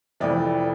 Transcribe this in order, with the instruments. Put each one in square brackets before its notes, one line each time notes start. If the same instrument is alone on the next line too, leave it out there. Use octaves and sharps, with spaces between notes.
[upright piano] F1 F2 E3 D5